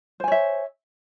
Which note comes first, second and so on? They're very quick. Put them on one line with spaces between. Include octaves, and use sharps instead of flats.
C5 G#5 C#5 E5